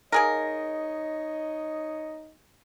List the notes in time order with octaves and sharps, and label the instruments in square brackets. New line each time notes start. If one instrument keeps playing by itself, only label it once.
[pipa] A#3 G#4 A#4 [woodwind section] D#4 C#5 D#5